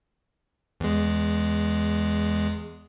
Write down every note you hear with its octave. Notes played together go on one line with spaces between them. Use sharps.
E2 G#3